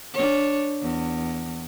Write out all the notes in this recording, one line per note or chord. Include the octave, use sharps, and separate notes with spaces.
D4 C#5
E2